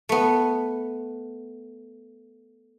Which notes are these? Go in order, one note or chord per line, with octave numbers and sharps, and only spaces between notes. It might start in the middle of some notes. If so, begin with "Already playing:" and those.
A3 B3